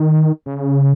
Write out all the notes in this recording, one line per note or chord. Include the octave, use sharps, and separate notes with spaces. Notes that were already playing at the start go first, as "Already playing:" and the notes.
Already playing: D#3
C#3